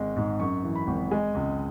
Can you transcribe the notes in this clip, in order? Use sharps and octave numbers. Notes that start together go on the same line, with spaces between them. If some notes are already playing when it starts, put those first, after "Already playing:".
Already playing: G#1 G#3
G#2
F#2 C#6
E3
B5
G#1
G#3 G#5
C#2